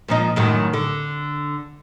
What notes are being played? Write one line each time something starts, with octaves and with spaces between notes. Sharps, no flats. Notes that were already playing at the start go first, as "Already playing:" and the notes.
A#2 F3 D#4
F#2 A2 D#3
D3